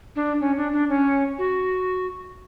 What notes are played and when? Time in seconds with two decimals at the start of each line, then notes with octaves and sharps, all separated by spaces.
0.16 D4
0.40 C#4
0.57 D4
0.73 D4
0.89 C#4
1.38 F#4